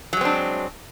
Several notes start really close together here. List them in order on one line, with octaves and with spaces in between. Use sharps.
F#3 G#3 C4 D4